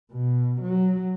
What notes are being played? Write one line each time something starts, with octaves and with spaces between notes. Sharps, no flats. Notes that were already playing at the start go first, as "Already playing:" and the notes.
B2
F#3